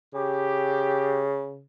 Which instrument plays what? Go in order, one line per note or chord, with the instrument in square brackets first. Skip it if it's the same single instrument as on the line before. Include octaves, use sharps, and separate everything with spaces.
[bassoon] C#3 [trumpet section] G4